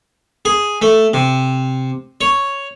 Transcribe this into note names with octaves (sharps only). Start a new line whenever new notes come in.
G#4
A3
C3
C#5